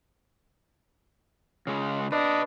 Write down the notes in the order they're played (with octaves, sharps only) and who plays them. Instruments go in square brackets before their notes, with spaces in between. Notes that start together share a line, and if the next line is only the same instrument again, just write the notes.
[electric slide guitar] C#3 G#3
[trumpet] D4 [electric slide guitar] B4 D#5